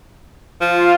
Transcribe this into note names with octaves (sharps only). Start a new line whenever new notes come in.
F3 F4